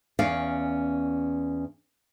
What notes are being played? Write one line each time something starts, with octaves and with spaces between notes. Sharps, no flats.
E2 C#4 D5 F5